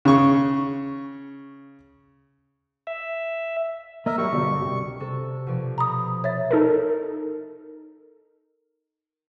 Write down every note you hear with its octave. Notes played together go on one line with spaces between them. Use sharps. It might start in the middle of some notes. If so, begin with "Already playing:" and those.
C#3 C#6
E5
A#3 A#4 D#5 E5
F#3 G3 G4 C#6
G1 B2 D3 D5
C2 C3 G4
C3 A4
B2 F3 D5
A#5 B5 D#6
C#5 E5 A6
D#4 A4 A#4